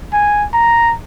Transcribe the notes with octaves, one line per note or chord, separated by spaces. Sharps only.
G#5
A#5